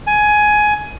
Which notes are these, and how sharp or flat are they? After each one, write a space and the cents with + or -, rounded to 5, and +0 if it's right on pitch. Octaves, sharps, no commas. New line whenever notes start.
G#5 +15